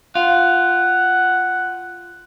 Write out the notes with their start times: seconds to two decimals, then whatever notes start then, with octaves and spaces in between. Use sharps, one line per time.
0.15 F4 F#5